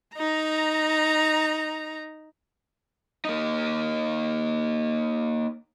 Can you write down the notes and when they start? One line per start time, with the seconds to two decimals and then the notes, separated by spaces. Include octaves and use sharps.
0.16 D#4 A#5
3.25 A#3 D#4